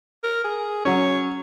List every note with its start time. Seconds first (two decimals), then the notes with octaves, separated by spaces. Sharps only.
0.24 A#4
0.44 G#4
0.85 F#3 C#4 C#5